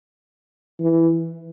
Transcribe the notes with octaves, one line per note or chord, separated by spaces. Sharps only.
E3